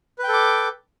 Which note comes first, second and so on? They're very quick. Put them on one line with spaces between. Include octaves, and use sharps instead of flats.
B4 G5 A4 D6